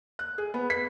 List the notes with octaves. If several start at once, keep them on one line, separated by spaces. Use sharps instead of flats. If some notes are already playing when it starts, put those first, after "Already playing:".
F#6
G#4
B3
B6